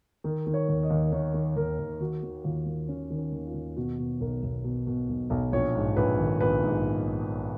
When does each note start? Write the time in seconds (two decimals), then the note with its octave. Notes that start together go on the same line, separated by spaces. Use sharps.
0.24 D#3
0.47 D#3
0.54 C#5
0.68 D#2
0.83 D#5
0.90 D#2
1.12 D#3 C#5
1.34 D#3
1.56 D#2 A#4
1.78 D#2
2.00 D#3 F#4
2.23 D#3
2.44 D#2 F4
2.66 D#2
2.88 D#3 C#4
3.10 D#3
3.18 C#4
3.32 D#2
3.47 F4
3.54 D#2
3.76 B2 F#4
3.99 B2
4.20 B1 A#4
4.43 B1
4.64 B2
4.87 B2
5.09 B1
5.30 B1
5.52 A#1 C#5
5.75 G#2
5.97 A#1 B4
6.19 D#3
6.41 A#1 B4
6.63 G#2